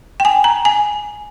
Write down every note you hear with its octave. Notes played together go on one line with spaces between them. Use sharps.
G5
G#5
A#5
G#5